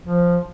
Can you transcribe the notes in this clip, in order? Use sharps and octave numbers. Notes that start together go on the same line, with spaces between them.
F3